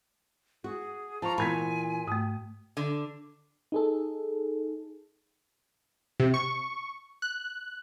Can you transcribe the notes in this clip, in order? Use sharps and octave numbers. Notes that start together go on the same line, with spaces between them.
F#4 G#4
F3 A5 A#5 C#6
A#2 E3 B3 G#5 B5 G#6 B6
G#2 A3 D#6
D3
D#4 G#4 A4
C3
C#6
F#6